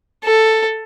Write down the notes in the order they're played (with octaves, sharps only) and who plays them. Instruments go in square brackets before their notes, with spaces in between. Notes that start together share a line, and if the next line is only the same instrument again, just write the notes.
[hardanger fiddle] A4